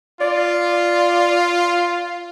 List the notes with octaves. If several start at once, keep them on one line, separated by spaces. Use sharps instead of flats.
F4 D5